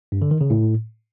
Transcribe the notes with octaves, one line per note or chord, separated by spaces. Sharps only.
G2
D3
D#3
C#3
A2